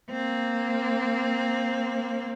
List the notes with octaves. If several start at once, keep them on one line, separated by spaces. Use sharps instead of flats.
A#3 C4